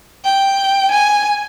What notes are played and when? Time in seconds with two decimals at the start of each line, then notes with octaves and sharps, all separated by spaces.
0.25 G5
0.91 G#5